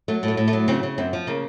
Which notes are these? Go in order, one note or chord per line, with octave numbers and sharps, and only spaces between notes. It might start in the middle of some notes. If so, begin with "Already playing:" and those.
F#3 A3
A2
A3
A2
A3
F#3
C#3 C4
C#3
F#2 C4
F3
C#3 A#3